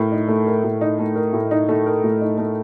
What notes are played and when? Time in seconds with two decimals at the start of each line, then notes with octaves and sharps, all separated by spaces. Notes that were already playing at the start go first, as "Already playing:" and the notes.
Already playing: A2 A#4
0.12 D#4
0.28 A3
0.47 A#4
0.64 A2
0.81 D#4
0.99 A3
1.16 A#4
1.33 A2
1.51 D#4
1.69 A3
1.86 A#4
2.04 A2
2.21 D#4
2.38 A3